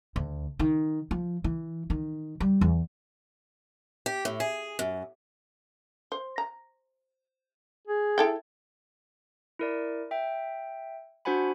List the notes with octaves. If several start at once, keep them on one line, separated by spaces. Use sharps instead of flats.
D2
D#3
F3
E3
D#3
G3
E2
G4
A2
G#4
F#2
C5
A#5
G#4
E4 A4 G5
E4 A#4 D5
E5 G5
D4 F#4 C5 F#5 G#5 B5